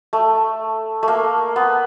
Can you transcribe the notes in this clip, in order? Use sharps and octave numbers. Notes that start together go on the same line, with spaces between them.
A3
A3
A#3
B3